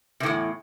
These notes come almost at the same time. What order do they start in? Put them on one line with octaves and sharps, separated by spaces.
C3 A2 E2